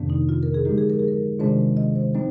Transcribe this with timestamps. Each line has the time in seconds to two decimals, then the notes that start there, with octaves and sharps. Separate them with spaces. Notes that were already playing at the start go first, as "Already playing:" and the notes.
Already playing: F2 C3 D#3 A#3 D4
0.10 D#4
0.29 F4
0.43 A#4
0.54 G#4
0.65 D3 F3 G#3 D#4 G4
0.78 G#4
0.90 A#4
0.99 G#4
1.08 A#4
1.39 C3 D#3 G#3 D4 F4 C5
1.77 D#5
1.96 C5
2.14 F3 C4 D#4 C5